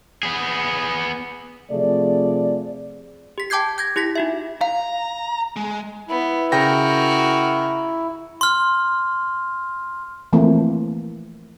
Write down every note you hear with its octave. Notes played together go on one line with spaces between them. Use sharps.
B3 G#4
C3 F3 A3 G#4 D5
G4 B6
G5 A5 D6 G6 G#6 C7
G6 G#6 A#6
E4 G4 A#6 B6
D#4 F#4 E5
F5 A#5
G#3
B3 E4
C#3 F#4 A#4 G5 A#6
C6 F6
E3 F3 A3 A#3 C4